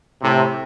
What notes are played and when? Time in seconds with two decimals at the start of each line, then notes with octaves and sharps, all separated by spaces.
0.21 A2 C3